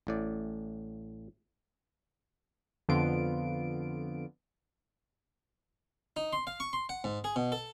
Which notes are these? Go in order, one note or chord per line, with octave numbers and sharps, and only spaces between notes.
A1 A2 D5
F2 D3 B3 F4 D7
D#4
C6
F5
C#6
C6
F#5
G#2
G#4
B2
A4